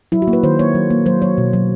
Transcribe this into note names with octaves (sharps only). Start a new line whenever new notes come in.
F#3 E4
F#4
A#3
B4
D#3 C5
A#3 C#5
F#3
A#3
F#3 C5
F#3 C#5
B2
F#3